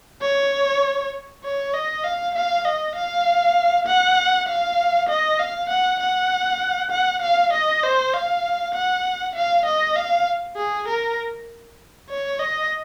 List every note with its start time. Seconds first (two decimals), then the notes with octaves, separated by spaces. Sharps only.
0.22 C#5
1.44 C#5
1.74 D#5
2.04 F5
2.35 F5
2.65 D#5
2.95 F5
3.87 F#5
4.48 F5
5.09 D#5
5.39 F5
5.69 F#5
6.00 F#5
6.91 F#5
7.22 F5
7.53 D#5
7.83 C5
8.13 F5
8.74 F#5
9.35 F5
9.65 D#5
9.96 F5
10.56 G#4
10.88 A#4
12.09 C#5
12.39 D#5